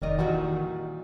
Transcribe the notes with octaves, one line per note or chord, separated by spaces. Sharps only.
F1 D#3 A#4 D5 D#5
A#2 E3 G3 F#4